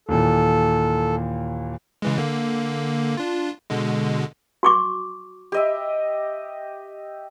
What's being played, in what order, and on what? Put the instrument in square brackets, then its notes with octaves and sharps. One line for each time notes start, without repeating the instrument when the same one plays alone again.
[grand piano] D#2 A#2 E3 [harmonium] A4
[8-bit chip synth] C#3 E3 G#3
D3 A#3
D4 F4
B2 D3 G#3
[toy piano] F#4 C#6 D6
[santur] G4 D#5 E5